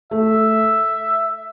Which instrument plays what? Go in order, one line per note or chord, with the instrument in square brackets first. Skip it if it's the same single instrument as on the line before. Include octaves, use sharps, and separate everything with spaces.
[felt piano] A3 [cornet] E5